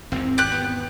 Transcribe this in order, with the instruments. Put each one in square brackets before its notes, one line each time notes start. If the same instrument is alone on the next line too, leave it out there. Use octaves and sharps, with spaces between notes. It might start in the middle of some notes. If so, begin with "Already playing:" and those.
[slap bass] G#1 E2 [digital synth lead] C4
[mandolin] G4 F#6
[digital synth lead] B3